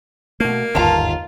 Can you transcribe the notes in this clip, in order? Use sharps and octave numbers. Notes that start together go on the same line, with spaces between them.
B2 A3 A#3
G1 D#2 G#2 F4 A5 A#5